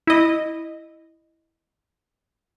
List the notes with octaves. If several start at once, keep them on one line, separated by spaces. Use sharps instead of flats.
E4 D#5